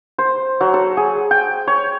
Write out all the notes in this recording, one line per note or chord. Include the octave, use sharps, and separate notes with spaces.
C5
F#3
A4
G#4
G5
C#5